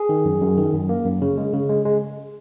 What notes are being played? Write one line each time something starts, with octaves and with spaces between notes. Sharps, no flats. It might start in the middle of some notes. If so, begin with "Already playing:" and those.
Already playing: G#4
D#3
F#2
F#2
D#3
F#2
A#3
F#2
C#3
G#3
C#3
G#3
G#3